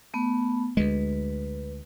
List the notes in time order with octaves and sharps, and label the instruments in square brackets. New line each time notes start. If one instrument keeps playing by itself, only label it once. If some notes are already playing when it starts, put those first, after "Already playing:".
[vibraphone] A3 B3
[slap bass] D2 G#3 [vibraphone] B4